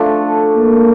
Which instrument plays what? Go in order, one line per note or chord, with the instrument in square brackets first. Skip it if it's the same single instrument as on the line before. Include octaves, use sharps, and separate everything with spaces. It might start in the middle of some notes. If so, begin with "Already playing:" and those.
Already playing: [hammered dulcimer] F3 A3 D4 A4
[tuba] A#3